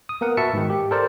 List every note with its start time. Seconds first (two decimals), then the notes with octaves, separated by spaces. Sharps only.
0.09 D#6
0.21 A#3 B3 A#4 F#5
0.37 F#4 B4 E5 A5 C#7
0.54 G#2 D#3
0.70 G4
0.91 A4 A#4 C5 D5 A5